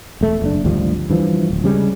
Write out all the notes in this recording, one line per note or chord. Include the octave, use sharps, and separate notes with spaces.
E1 A3
F#1 B2 D4
G#1 D2 F3 G3
G2 E3 F3
D1
C#3 G3 G#3